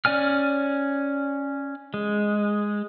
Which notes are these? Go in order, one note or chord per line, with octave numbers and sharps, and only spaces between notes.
C#4 D5 G#5 F6
G#3